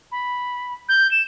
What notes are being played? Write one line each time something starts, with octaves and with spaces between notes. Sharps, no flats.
B5
G6
E7